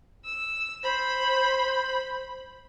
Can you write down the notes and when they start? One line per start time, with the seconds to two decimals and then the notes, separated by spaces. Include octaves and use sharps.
0.25 E6
0.83 C5 B5